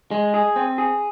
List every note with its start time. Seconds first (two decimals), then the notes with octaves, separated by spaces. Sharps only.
0.11 G#3
0.34 G#4
0.56 C4
0.78 G#4